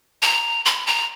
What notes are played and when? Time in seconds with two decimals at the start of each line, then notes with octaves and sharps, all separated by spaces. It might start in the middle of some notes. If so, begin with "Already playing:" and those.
0.22 A#5
0.66 B5
0.87 A#5